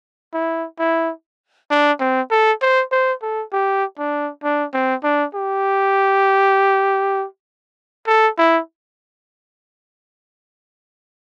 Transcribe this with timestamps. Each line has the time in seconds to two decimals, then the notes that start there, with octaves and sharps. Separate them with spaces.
0.34 E4
0.79 E4
1.70 D4
2.00 C4
2.31 A4
2.61 C5
2.92 C5
3.22 A4
3.53 G4
3.98 D4
4.43 D4
4.73 C4
5.03 D4
5.34 G4
8.07 A4
8.38 E4